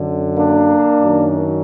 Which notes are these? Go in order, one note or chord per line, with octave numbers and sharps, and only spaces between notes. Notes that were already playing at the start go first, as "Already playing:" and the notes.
Already playing: F#2 D3
A#3 D4
F#2 D#3